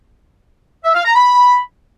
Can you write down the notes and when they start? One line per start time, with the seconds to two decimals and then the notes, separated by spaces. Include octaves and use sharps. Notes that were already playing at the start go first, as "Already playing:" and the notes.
0.84 E5
0.94 F5
1.05 A#5
1.15 B5